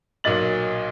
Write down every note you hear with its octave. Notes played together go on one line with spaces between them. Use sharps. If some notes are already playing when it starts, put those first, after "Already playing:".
B1 A#2 F#3 D#5 A6 F#7